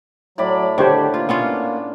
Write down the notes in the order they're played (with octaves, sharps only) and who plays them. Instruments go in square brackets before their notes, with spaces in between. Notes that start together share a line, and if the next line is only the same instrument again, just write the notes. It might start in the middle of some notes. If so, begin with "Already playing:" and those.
[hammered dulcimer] A2 D5 B5 [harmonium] F#3
[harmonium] D3 [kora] D#3 [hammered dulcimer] D4 [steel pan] G4 C5 C#5
[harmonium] A#3 [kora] F4
[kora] B3 C#4 F4